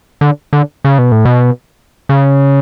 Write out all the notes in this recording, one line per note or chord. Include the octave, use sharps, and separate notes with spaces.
D3
D3
C#3
B2
A2
B2
C#3